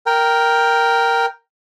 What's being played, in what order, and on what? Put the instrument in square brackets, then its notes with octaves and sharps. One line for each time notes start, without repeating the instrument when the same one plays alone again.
[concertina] A#4 G5